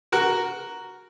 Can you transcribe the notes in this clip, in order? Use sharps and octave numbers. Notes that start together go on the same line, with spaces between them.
F#4 A#4